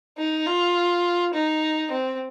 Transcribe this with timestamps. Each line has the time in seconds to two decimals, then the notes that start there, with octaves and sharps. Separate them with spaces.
0.17 D#4
0.46 F4
1.33 D#4
1.91 C4